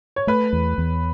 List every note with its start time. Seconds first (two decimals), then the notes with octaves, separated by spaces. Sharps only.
0.16 C#5
0.27 A3 B4
0.53 E2
0.78 E2